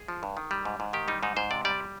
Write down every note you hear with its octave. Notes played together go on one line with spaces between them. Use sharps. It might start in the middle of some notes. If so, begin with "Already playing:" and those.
Already playing: G#4
F3
G2
D#3
G3
G#2
G#2
D#3 G4
G3 D#4
G#2 D#4
G#2 C5
C3 D5
G3 D5